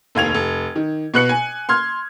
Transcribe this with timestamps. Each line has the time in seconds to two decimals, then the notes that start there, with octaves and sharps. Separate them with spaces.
0.15 F1 D#2 G#6 F7
0.34 F1
0.76 D#3
1.14 B2 B4 F#6 C#7
1.29 G#5
1.69 C6 F6 G#6